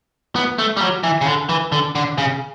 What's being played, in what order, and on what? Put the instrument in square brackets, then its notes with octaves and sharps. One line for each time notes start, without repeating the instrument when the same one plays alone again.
[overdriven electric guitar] B3
A3
G3
F#3
E3
C#3
D3
E3
D3
D3
C#3